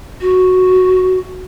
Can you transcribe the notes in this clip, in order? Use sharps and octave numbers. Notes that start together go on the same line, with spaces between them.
F#4